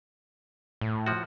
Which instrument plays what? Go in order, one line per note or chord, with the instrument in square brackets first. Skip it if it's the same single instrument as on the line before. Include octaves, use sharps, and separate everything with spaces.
[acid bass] A2
[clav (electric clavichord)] F3 F#4